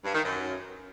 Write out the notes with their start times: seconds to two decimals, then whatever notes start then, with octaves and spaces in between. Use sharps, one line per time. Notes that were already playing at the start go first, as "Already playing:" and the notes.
0.05 G2
0.15 D#3
0.25 F#2